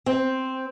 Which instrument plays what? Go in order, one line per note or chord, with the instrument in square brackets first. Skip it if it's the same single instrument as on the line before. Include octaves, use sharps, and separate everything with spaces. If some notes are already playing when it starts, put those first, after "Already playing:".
[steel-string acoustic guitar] C4